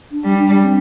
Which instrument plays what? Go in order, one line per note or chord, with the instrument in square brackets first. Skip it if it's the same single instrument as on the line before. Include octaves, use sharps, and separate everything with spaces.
[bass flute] D4
[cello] G3
[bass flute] D4
C4